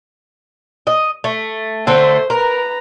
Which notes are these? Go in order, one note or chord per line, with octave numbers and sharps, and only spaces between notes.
D#5
A3
D3 A3 C4 A4 C5
A#4 B4 A#5